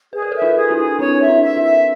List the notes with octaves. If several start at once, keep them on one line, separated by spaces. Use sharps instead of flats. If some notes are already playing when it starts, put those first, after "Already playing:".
G#4 B4
A#4
A4 B4 E5
D#4 F4
G#4
D4 E4
G#4
C4 D4 C#5
E5
D4 E4
E5
D4 E4
E5